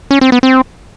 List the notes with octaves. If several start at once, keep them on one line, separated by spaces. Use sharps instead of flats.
C#4
C4
B3
C4